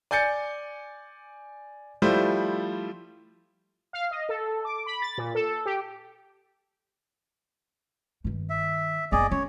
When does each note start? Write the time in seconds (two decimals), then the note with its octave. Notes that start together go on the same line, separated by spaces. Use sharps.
0.11 D5 G#5 G6 A6 C#7
2.02 F3 G3 A3 E4 C5
3.93 F5
4.11 D#5
4.29 A4
4.65 D6
4.86 B5
5.02 A6
5.18 A#2
5.35 A4
5.66 G4
8.24 G2 D#3
8.50 E5
9.12 F#1 B3 G#4 D5 D#5
9.31 C#4 C#5